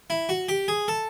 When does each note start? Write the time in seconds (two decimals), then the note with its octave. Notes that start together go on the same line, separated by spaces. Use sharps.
0.10 E4
0.29 F#4
0.49 G4
0.68 G#4
0.88 A4